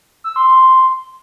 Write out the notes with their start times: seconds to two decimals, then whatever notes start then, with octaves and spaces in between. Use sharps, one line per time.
0.24 E6
0.36 C6
0.48 C6